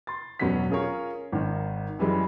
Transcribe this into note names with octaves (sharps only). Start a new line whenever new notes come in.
C6 A6
E1 B2 F#3 C#4 F#5 B6
C#4 F4 G#4 A#4 C#5
G#1 D#3
F#2 E3 G3 G#3